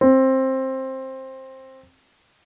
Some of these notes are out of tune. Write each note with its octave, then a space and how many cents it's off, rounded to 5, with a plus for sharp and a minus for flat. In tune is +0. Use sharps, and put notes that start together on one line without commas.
C4 +15